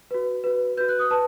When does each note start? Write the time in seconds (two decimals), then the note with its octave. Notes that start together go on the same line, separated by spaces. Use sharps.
0.11 F#4 B4
0.44 F#4 B4
0.77 F#4 B4 G6
0.89 F#6
0.99 D#6
1.11 B4 A5